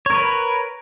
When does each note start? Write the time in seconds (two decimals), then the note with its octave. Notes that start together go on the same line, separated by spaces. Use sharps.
0.06 C#5
0.10 A#4
0.14 B4